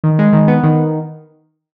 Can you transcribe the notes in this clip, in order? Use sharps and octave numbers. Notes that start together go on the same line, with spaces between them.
D#3
G#3
D#3
B3
D#3